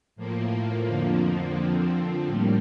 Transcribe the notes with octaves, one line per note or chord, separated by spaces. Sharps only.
A2 F3 A#3
F2 D3 F3 A#3
D3 F3 C4
A2 G3 A#3